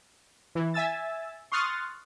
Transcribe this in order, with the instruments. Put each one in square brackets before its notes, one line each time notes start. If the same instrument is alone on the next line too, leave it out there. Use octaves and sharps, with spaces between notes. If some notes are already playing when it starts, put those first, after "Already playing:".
[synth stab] E3
E5 G#5 E6 A6
C6 C#6 D#6 F6 F#6 A6